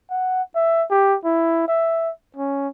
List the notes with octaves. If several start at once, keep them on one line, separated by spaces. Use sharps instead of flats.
F#5
E5
G4
E4
E5
C#4